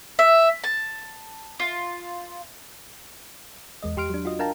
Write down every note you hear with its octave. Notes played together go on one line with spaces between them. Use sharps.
E5
A5
F4
E2 G#3 D#5
E2 G4 C6 F6 D7
F#3 D4
F4 F#4 D#5
D4 A#4 F5 G5 A5 A#5